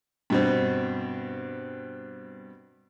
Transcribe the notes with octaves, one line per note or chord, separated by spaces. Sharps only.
G2 B2 C4